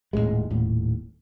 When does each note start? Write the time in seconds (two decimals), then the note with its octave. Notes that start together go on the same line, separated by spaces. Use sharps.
0.13 D#1 C#2 A2 G#3
0.50 D#1 A2